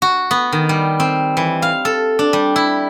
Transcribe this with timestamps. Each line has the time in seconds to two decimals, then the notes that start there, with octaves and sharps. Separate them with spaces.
0.02 F#4
0.31 B3
0.52 D#3
0.69 G3
1.00 C4
1.37 E3
1.62 F5
1.85 A4
2.19 D4
2.33 G3
2.56 E4